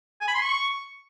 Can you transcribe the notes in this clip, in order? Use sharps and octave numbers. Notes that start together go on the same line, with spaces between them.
G#5
B5
C6
C#6